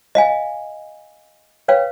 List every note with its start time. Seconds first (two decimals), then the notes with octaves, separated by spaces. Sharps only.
0.15 D#5 F5 G#5
1.68 B4 C#5 F5 G5